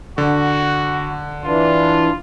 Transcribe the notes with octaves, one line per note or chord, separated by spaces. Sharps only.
D3 F#4
E3 D4 F4